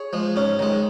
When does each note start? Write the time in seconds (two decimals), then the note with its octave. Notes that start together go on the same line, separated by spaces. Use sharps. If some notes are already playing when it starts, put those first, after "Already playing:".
Already playing: G#4 C#5
0.13 F3 G#3
0.36 G#2 C#4
0.59 D#3 G#3